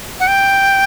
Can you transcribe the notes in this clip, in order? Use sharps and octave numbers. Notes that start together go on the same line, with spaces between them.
F#5
G5